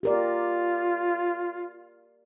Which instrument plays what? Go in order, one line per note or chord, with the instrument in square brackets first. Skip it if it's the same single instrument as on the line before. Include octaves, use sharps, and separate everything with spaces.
[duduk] F4 [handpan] G4 A#4 D5